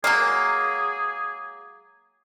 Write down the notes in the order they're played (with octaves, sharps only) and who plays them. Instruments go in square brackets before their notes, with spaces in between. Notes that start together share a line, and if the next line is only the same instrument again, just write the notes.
[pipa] F#3 G#3 A#3 [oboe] G#4